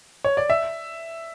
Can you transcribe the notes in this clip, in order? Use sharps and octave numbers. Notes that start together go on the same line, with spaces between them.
C#5
D5
E5